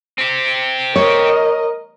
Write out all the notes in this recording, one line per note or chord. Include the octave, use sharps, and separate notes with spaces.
C4 G4
A#4 C#5 D#5